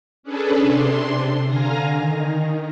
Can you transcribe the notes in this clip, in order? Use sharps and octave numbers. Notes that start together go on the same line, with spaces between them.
C#4 D4 G#4 A4 B4
C3 D4 C6
D3 F5 G#5 A#5 A#6
D#3